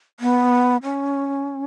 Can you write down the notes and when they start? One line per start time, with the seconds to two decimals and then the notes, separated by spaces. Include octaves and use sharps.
0.20 B3
0.83 C#4